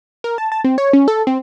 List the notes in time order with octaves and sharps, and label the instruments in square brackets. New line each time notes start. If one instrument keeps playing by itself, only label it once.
[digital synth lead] A#4
A5
A5
C4
C#5
C#4
A4
C4